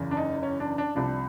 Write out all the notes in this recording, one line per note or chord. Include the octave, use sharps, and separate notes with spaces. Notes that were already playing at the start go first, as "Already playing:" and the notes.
Already playing: F#1 E2 C#3
D4
D#4
C#4
D4
D4
C2 C3 F3 D4